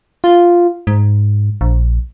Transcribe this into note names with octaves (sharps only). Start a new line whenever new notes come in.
F4
G#2
A#1